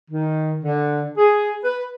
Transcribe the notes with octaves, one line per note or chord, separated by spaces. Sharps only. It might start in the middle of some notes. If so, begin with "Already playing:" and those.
D#3
D3
G#4
B4